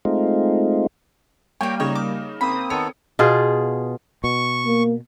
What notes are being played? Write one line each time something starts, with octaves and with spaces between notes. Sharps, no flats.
G#3 A3 C4 D#4 F4
G3 A#3 G4 C#5 G5
C#3 D#4 C#5
D6
A#3 C4 B5 D#6
D#3 B3 A4 C#5 C#7
B2 F4 G#4
B2 C#6
A#3